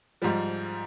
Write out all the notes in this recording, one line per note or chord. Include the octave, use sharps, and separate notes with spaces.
G#2 F3 G3